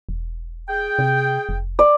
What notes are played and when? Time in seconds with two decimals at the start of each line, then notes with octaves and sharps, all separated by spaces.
0.09 E1
0.69 G#4 G5
0.99 C3
1.49 F1
1.79 D5